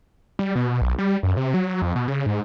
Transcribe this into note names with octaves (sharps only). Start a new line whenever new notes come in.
G3
B2
B1
G3
F#2
C3
F#3
F2
B2
C#3
G#2